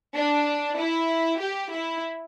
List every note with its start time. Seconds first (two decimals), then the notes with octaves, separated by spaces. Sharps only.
0.16 D4
0.79 E4
1.42 G4
1.73 E4